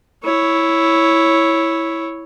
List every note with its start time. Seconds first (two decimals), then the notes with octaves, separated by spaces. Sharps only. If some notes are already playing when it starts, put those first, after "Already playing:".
0.23 E4 C#5